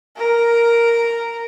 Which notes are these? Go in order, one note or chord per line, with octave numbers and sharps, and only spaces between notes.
A#4